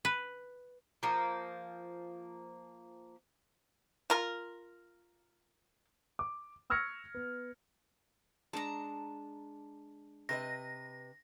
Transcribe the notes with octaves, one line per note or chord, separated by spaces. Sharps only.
B4
F3 A#3
F4 A#4
D6
C#6 E6 F6 G#6 A#6 C#7
B3
G#3 D4 A5 A#5
C3 B4 D#5 A#6